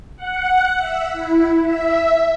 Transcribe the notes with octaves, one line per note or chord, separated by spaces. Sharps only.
F#5
E5
E4
E5